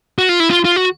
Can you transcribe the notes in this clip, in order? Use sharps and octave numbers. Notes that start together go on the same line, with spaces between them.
F#4
F4
E4
F4
F4
F#4